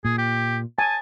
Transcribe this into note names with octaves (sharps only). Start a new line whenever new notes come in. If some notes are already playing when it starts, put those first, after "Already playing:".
A#2 G#4
G4
G#5 A5